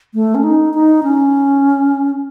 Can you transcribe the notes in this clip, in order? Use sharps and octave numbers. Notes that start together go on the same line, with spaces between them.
A3
C#4
D#4
D#4
C#4